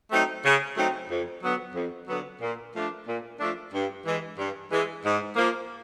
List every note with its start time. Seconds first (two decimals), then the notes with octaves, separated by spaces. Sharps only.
0.11 F#3 A3 C4 D#4
0.44 C#3
0.76 F#3 A3 C4 D#4
1.10 F2
1.43 D3 F#3 B3
1.75 F2
2.08 D3 F#3 B3
2.41 A#2
2.73 F3 A3 D4
3.07 A#2
3.39 F3 A3 D4
3.73 G2
4.05 E3 G#3
4.38 G2
4.71 E3 G#3
5.05 G#2
5.36 F3 A#3